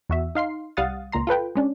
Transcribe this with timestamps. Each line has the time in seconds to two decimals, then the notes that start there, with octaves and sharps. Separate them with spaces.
0.09 E2 F#4 E5
0.35 D#4 F5 C6 C7
0.77 C2 G3 F5 F#5 D#6 A6
1.12 C#2 A#2 A#5 C6
1.27 F4 A4 B4 G5
1.55 G#3 C#4 D4